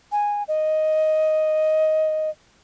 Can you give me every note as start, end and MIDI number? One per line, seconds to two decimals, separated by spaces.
0.12 0.43 80
0.48 2.30 75